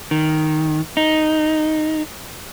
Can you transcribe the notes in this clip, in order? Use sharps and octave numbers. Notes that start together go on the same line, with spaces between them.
D#3
D#4